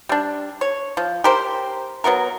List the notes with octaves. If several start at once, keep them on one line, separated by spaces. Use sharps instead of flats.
G3 D4
C#5
F3
G4 A#4 C5
F#3 B3 F#4 A#4